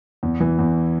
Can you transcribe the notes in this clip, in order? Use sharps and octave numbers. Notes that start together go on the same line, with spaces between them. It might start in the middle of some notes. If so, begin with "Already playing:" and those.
E2
E3
E2